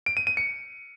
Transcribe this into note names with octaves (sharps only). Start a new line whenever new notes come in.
D7
D#7
D#7
C#7